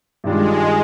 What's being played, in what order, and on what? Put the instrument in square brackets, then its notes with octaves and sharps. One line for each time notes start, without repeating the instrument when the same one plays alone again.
[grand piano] G2 D#3 G3 D4 F4 [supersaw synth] G#3